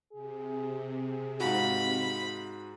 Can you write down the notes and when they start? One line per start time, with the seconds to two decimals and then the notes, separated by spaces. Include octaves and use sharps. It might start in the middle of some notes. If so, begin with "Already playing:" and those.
0.13 C3 G#4
1.40 G#2 D#4 F4 F#4 B5